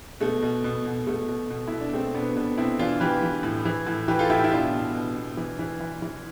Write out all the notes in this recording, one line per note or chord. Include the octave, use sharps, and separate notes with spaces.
B2 A3
B2
B2
B2
B2 A3
B2
B2
B2 E4
D4
B2 A3 C4
B2 B3 D4
B2 B3 D4
B2 C4 E4
E3 D4 F4
E3 G4 B4
E3
A2
E3
A2
E3 G4 B4
F4 A4
A2 E4 G4
E4
B2 D4 F4
B2
B2
B2
E3
E3
E3
E3